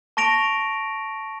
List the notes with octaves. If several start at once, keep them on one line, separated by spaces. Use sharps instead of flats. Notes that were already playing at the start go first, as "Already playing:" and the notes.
A5 C#6 A#6 D7 F7